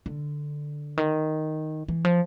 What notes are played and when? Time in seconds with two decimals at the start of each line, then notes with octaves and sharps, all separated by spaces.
0.06 D3
0.97 D#3
1.88 E3
2.05 F3